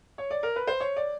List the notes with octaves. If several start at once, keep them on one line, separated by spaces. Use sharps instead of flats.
C#5
D5
A#4
B4
C5
C#5
D5